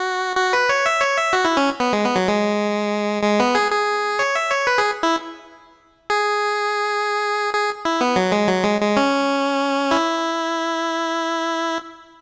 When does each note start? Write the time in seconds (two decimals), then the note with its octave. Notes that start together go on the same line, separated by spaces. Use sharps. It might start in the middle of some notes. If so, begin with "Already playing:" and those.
Already playing: F#4
0.37 F#4
0.53 B4
0.69 C#5
0.86 E5
1.00 C#5
1.18 E5
1.33 F#4
1.45 E4
1.57 C#4
1.80 B3
1.93 G#3
2.04 B3
2.16 F#3
2.28 G#3
3.23 G#3
3.40 B3
3.55 G#4
3.72 G#4
4.19 C#5
4.36 E5
4.51 C#5
4.67 B4
4.78 G#4
5.03 E4
6.10 G#4
7.54 G#4
7.85 E4
8.01 B3
8.16 F#3
8.32 G#3
8.48 F#3
8.64 G#3
8.81 G#3
8.97 C#4
9.91 E4